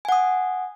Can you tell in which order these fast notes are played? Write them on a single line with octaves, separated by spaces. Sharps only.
G#5 F#5 D#6